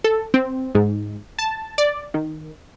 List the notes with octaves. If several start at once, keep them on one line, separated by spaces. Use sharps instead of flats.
A4
C4
G#2
A5
D5
D#3